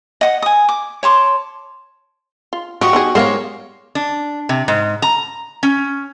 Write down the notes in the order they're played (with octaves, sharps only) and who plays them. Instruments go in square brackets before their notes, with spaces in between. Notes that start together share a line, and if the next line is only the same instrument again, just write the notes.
[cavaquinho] D#5 F#5 D#6
G#5 D#6
D6
C#5 A5 C6 D6
[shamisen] F4
[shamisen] F3 [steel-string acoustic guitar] F#4 [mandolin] G4 D#5 C#6
[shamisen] B3 D#4 G#4
[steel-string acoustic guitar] G#3 D#4 G4 [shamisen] B3 A#4 F5 [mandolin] C5 C#5
[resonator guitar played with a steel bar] D4
C3
G#2
A#5
C#4